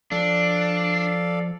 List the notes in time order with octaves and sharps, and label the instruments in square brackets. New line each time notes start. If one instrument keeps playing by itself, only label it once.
[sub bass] F3 [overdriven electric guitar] D4 [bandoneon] A4 D5 F5